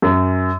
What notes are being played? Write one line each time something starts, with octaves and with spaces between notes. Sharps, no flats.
F#2